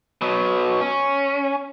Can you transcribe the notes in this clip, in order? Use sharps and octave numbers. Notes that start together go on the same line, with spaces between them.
B2 F#3
C#4